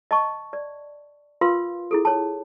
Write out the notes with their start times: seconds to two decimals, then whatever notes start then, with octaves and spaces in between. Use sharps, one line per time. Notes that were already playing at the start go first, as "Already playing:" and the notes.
0.11 D#5 A5 C#6
0.53 D5
1.41 F4 A#4 B4 F5 C6
1.91 E4 G#4 A4
2.05 C#5 A5